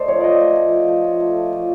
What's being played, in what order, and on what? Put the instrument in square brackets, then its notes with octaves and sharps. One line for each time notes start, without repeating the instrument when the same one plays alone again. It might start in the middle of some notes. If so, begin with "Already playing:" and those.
Already playing: [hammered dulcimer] A3 [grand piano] C5 D5 D#5
[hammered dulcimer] F3 [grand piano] C#5
[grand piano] D5
[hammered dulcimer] C#4 [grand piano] D#5
[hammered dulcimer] A3
F3
F3
A3
F4
A3
A3
F3